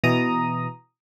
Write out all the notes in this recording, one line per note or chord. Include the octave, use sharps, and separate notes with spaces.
B2 E3 A#5 D#6